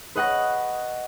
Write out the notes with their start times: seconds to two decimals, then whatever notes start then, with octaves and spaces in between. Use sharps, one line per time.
0.16 B4 D#5 F#5 C#6 A#6